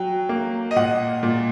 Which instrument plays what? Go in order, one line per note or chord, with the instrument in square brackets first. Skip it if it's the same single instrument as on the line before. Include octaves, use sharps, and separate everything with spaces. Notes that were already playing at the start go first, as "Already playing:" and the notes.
Already playing: [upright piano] F#3 [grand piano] G5
[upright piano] A#3
[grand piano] D#5
[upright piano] A#2 [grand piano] F#5
[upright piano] A#2